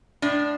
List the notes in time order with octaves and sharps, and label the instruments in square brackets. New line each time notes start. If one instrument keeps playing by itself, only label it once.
[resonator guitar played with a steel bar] A2 D4